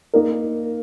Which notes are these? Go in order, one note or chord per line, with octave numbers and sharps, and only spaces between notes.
A#3 D#4 A#4